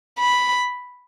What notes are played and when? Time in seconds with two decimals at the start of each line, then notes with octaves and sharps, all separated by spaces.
0.19 B5